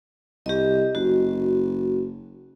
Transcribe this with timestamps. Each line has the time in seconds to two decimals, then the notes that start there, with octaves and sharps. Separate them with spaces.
0.46 C2 G4 D#5
0.95 F#1 F#4